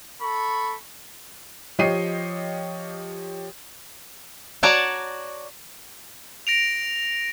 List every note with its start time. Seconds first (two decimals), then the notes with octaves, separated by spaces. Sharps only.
0.21 A4 B5 C#6
1.79 F3 G4 C#5 D#5 C7 D#7
4.63 F#4 C#5 D5 F#5 A5 A#5
6.47 A#6 D7 F7